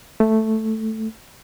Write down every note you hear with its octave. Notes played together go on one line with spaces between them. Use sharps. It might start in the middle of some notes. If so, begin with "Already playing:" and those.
A3